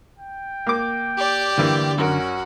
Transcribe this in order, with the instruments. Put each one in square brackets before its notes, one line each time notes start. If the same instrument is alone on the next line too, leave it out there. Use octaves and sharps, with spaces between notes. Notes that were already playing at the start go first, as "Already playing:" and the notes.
[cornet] G5
[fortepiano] A#3 D6
[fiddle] G4 D5
[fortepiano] G2 E3 A#3 [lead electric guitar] D3
[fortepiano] F#2 A#4 [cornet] C#4 [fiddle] F#4